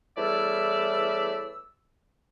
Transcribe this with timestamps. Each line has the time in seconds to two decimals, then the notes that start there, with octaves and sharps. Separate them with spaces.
0.18 E2 A2 G3 D5 E5 E6